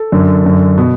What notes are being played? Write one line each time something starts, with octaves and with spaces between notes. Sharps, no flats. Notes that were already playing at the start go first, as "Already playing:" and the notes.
Already playing: A4
F#2 D3
F#2 D3
B2